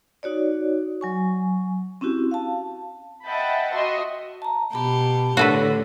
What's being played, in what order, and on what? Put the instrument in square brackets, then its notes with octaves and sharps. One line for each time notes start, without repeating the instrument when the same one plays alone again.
[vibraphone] D#4 F#4 C#5 D5
F#3 G#5 C#6
C4 C#4 E4 F#4 G4
F5 A5
[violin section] D#5 E5 F#5 G5 A5 B5
F#4 D#5 E5 C6
[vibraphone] A5 A#5
[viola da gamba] B2 G4 [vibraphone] A5 B5
[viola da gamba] A2 [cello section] D3 [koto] F#4 A4 B4 [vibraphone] C#5